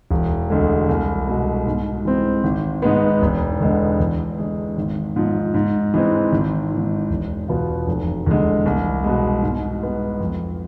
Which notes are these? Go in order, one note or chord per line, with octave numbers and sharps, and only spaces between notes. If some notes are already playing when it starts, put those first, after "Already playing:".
E1
D2 D3 G#3
C2
B2 G#3
G#2
E3 G#3 C4
G#1
G#2 G#3 B3
E1
E2 D3 G#3 B3
E2
D3 G#3
G#1
G#2 F3
G#2
E3 G#3 C4
G#1
G#2 E3
E1
E2 B2 B3 F4
F1
E2 D3 G#3
C2
B2 G#3
G#2
G#3 B3
F2